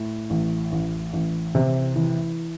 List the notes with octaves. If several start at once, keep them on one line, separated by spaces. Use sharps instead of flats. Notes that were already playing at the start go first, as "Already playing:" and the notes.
Already playing: A2
A1
A1
A1
C3
E3